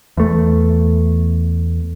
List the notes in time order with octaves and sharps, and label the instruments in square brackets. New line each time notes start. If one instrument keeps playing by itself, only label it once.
[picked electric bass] E2 A3